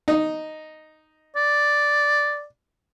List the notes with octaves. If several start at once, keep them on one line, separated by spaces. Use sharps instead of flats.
D#4
D5